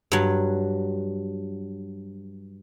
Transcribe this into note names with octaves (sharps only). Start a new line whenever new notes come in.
G2 F#3